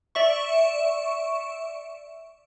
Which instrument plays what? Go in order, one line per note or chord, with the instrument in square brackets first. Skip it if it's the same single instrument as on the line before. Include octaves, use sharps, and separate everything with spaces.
[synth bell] D5 E5 C#6